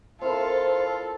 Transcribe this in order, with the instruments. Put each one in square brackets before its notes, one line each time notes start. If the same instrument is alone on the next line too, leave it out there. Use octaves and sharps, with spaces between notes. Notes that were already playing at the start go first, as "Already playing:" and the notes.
[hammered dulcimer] C4 E4 A#4 [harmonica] F4 F5 [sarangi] A4 [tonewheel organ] C5